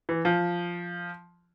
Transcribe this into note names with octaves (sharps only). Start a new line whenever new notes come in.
E3
F3